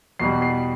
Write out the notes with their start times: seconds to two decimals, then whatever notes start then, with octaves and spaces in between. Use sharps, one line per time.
0.20 E2 B2 G3 C7
0.42 C7